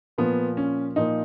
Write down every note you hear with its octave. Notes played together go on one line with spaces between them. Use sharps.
A#2 F3 A#3 B3
C#4
A#2 F3 A#3 D#4